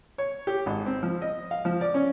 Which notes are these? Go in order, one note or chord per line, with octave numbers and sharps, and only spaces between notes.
C#5
G4
G#1
C4
F3
D#5
F5
F3
D5
C#4